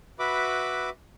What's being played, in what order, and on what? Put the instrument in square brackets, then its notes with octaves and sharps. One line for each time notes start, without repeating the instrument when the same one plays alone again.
[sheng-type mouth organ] F#4 B4 E5 B5 D6